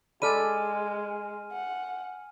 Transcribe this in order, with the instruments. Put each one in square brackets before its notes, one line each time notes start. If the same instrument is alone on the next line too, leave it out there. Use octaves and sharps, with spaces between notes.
[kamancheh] G#3 [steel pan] A4 D5 B5 [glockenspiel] G#5 F6 D#7
[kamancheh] F#5